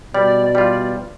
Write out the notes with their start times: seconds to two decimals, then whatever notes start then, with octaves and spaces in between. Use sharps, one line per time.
0.14 B2 G3 D5
0.55 G3 F4